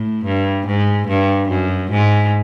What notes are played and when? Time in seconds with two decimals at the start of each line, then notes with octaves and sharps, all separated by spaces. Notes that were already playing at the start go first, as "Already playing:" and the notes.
Already playing: A2
0.25 G2
0.67 G#2
1.08 G2
1.49 F#2
1.91 G#2